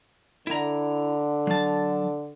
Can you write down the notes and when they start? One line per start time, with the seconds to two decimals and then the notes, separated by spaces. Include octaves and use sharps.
0.47 D3 E4 A#5
1.47 F#3 A5